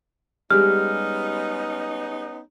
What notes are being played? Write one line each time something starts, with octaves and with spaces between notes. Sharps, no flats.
G3 G#3 B3 C#4 D#4 G4 F6